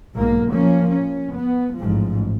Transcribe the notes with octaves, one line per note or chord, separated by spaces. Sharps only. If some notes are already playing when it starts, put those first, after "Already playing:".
B1 G#2 A#3
F3 A#3 C#4
C#4
B3
A1 G#2 F3